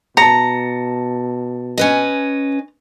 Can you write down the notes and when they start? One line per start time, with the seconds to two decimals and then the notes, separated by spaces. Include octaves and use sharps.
0.17 B2 A5 A#5 C#7
1.78 C#4 B4 D#5